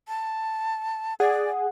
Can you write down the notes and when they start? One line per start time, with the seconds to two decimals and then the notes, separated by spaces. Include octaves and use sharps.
0.08 A5
1.20 G#4 D5 F#5